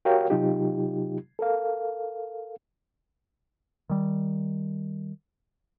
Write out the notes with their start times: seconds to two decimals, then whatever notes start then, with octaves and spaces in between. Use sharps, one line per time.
0.05 F#4 G4 A#4 C#5 F5 G5
0.30 C3 F#3 D#4 F4 G4
1.39 A4 A#4 F5
3.90 D#3 G3